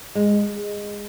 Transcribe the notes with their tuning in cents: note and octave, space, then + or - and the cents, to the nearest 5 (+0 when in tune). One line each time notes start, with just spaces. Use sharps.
G#3 -15